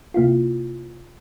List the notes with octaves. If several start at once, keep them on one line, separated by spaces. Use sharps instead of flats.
C3 A#3 E4 F4